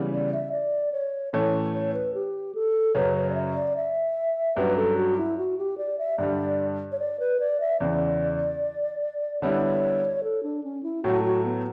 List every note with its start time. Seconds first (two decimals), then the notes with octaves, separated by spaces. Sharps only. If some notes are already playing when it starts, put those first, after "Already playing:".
Already playing: C#3 E3 G3 B3
0.12 D5
0.33 E5
0.52 D5
0.92 C#5
1.33 A2 E3 A3 C#4 C#5
1.74 C#5
1.94 B4
2.14 G4
2.55 A4
2.95 F#2 C#3 F#3 C#4 B4
3.16 C#5
3.30 D5
3.35 E5
3.55 D5
3.76 E5
4.57 G2 F#3 C#4 B4
4.76 A4
4.97 F#4
5.17 E4
5.38 F#4
5.58 G4
5.78 D5
5.98 E5
6.18 G2 D3 G3 D5
6.92 C#5
6.99 D5
7.20 B4
7.40 D5
7.60 E5
7.80 E2 C#3 E3 D5
9.41 D3 G3 B3 E4 C#5
10.24 A4
10.43 D4
10.64 C#4
10.83 E4
11.03 A2 F#3 A3 F#4
11.24 F#4
11.44 B3